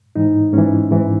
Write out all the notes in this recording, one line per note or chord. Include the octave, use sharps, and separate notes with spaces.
G#2 E3 D#4
G#2 E3 C#4
G#2 E3